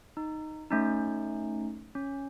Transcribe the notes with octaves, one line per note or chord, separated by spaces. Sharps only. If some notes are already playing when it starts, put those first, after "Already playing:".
D#4
A3 C#4 D#4
C#4